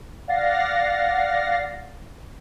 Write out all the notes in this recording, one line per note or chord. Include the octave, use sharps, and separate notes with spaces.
D5 F5 F#5 A6 A#6 C7